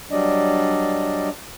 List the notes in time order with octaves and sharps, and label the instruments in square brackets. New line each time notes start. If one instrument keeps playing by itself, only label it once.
[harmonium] F#3 G3 D4 D5 D#5